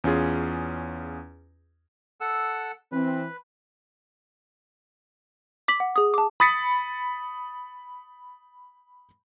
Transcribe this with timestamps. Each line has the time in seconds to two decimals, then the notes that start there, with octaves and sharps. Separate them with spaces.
0.04 E2 C#4 F4 G#4
2.21 A4 F#5 E6
2.92 E3 C4 B4
5.68 D6 B6 F#7
5.80 F#5
5.96 G#4 D#6
6.14 A5 D6
6.40 B5 D#6 A6 B6 C#7